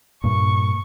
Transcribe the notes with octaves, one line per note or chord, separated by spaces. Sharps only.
G2 A#2 C#6